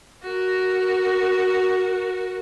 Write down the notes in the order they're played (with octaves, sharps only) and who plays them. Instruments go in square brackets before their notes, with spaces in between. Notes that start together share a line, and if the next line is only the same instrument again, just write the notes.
[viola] F#4 A#4